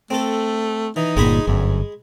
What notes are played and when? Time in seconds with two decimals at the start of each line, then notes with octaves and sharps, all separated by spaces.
0.10 A3 C4 A4
0.96 E3 D#4
1.17 G1 A#2 G#3 G#4 B5
1.47 G1 F#2